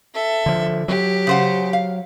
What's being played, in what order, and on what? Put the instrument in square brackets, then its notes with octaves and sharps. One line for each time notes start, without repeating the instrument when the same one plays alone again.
[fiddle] A4 E5
[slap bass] D3 F3
[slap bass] F#3 [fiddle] G4
[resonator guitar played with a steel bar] C#3 C5 F#5
F5